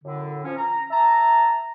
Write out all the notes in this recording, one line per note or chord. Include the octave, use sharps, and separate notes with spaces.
F#2 A2 D3
F3 C#4
A#5
E5 A5 A#5